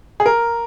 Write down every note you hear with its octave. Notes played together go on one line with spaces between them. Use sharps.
G#4
A#4